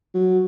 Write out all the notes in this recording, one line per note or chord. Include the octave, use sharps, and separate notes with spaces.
F#3